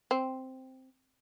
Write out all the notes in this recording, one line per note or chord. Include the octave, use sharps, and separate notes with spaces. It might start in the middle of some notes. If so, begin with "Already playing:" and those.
C4